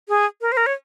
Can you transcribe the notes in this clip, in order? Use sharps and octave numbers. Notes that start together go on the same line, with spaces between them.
G#4
A#4
C5
A#4
C#5